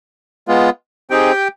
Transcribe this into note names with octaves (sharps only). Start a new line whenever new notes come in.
G#3 B3 F4
C4 D#4 G4 G#4 G5